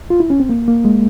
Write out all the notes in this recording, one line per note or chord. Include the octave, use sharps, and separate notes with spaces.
F4
E4
C#4
C4
A#3
A#3
G#3